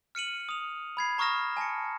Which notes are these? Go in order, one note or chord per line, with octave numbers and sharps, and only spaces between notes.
F6 C#7 D#7 F#7
D#6 F7
B5 G#6 C7
A#5 C#6 D#6 F6 A#6 E7
G#5 A5 A#6 C#7